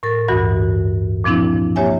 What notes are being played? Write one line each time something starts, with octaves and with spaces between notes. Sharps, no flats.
A2 A#4 A6
D2 G2 E3 F#4
A#2 F3 C4 D4 E4
A#3 G4 C#5 E5 G#5